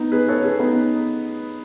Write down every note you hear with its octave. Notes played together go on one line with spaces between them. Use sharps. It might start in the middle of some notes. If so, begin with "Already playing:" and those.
Already playing: B3 D#4
G#4 B4
A4 C#5
G#4 B4
B3 D#4